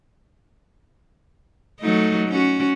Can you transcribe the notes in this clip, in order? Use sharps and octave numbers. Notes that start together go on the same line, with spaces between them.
F#3 A3 D#4
C#4 F#4